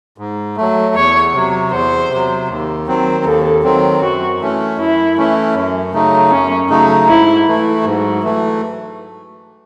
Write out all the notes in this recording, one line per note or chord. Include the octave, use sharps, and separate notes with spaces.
G#2
F#3 A3
E2 C#5
C3 F#3
E2 C5
C3 F#3
D#2
D#3 F#3 C4
D#2 A4
D#3 F#3 C4
F#2 F#4
E3 A3 C#4
F#2 E4
E3 A3 C#4
F#2
C#3 F#3 A3 D#4
F#2 C#4
C#3 F#3 A3 D#4
G#2 E4
E3 A3
G#2 F#3
E3 A3